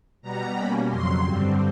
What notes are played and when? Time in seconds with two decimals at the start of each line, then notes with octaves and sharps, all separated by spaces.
0.22 B2 G3 B3 A#5
0.55 B2 G3 A#3 C#4 B5
0.89 F2 C#3 F#3 C6
1.23 G2 D3 G3 C4